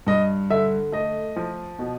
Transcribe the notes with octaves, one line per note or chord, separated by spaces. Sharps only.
G2 D#5
D3 E5
A3 D#5
F3
B2